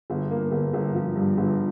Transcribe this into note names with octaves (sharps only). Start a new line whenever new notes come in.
G1
A#3
G1
G1
F3
G2
G1